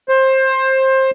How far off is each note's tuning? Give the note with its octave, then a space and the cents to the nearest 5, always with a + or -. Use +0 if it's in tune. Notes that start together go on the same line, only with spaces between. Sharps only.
C5 +20